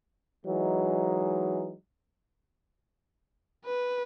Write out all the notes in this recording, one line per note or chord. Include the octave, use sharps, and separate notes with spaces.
E3 F#3 G#3 D#4
B4